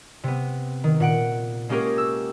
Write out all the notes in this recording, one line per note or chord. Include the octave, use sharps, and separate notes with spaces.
C3 B3
D#3
A#2 F#5 D7
G#3 A#3 C#4 G4 G#4 A#4
E6